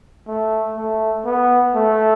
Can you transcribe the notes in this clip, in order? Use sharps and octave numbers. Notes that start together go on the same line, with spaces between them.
A3
A3
B3
A3